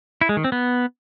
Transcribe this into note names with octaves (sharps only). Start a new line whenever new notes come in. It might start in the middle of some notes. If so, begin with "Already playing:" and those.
E4
G#3
D#3
C4
B3